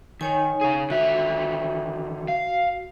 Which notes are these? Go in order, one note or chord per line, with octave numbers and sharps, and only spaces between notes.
D#3 D#4 C#5 G#5
C#3 G#4
D3 D#3 F#4 E5
F5